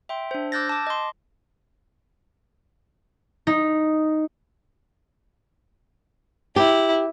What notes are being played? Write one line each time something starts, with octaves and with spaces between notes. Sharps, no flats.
E5 G5 C6
D4 C5
D6 E6 F#6 G6 A6 A#6
A5 D6
D#5 C6
D#4
E4 G4